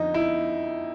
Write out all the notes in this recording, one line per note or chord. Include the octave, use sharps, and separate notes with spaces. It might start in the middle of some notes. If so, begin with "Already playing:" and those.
Already playing: F2 D3 F3 D#4
E4